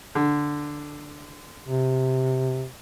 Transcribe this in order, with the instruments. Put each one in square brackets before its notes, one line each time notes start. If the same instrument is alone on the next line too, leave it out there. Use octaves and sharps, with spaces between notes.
[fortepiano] D3
[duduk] C3